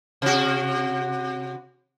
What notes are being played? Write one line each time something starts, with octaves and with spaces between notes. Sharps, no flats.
C3 F#4